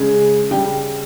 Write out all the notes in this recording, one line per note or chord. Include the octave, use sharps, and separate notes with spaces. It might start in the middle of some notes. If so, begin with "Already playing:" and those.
Already playing: C#3 G#3
C#3 G3 G5